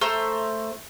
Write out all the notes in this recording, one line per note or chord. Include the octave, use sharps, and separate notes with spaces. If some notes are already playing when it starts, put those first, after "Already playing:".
A3 C5 A#5 E6